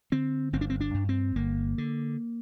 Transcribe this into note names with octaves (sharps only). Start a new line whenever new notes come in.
D3 C4
G1 C4
D4
C4
D4
G2
C4
G1 A#3
D3